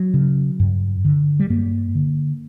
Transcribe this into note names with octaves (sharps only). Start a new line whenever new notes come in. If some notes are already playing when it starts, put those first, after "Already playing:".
Already playing: F#3
C#3
G2
D3
G3
G2 A#3
D3